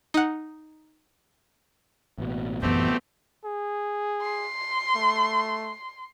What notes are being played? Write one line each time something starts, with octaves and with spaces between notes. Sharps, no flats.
D#4 F#5
A1 B2
F#2 E3 A3 B3 C4 G4
G#4
C6
A3